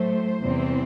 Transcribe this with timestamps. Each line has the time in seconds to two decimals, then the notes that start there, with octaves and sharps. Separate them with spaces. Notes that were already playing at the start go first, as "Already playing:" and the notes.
Already playing: A2 F#3 A3 C5
0.40 E2 C3 E3 G3 C4